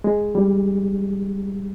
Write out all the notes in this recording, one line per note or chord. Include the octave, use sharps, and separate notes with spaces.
G#3
G3